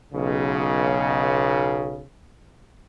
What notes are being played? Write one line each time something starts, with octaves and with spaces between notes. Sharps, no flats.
B1 C#3